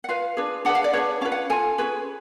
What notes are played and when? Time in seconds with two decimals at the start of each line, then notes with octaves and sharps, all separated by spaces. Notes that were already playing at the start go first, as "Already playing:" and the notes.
0.04 F#5
0.09 F4 B4 F5
0.37 D4 G#4 B4
0.65 D4 G#4 B4 F#5
0.75 F5
0.84 D5
0.93 D4 G#4 B4 C#5
1.21 C#4 F4 B4 F5
1.32 F#5
1.50 F4 A4 G#5
1.78 C#4 F4 G#4 B4